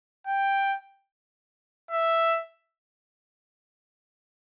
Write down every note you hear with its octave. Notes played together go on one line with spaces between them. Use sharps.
G5
E5